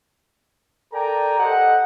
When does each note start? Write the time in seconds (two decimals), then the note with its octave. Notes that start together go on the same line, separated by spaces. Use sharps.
0.93 A4 A#4 D5 G5 G#5 A#5
1.39 G4 A4 C5 D#5 F#5